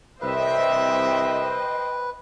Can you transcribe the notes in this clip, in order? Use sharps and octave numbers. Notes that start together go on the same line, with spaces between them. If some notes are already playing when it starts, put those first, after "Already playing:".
C2 B4 C5 D#5 E5 G5